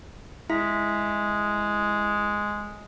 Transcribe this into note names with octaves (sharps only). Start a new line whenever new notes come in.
G#3 E4 E5 B6